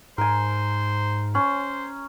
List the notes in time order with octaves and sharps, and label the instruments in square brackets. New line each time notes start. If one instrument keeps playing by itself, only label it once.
[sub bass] G#2 [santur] A#4 G#5 [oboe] C5
[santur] C#4 [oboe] C5